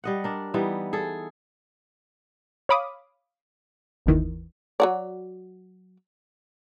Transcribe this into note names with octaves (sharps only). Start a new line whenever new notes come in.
G3 D#5 F#5
D4 A#4
E3 G3 B3 D#4
G#4 A4
C#5 F5 B5 D6 D#6
G1 D#2 D#3 E3
F#3 F#4 D5